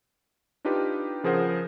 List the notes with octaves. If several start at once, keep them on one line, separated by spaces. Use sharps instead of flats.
D4 D#4 F4 G4 B4
C#3 F3 G#4 A#4 C5 F#5